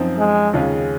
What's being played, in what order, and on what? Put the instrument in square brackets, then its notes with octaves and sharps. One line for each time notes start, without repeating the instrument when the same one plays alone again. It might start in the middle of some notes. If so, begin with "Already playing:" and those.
Already playing: [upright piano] F#2 F3 C4 D#4
[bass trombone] G#3
[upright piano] D#2 C#3 G#3 C#4 F4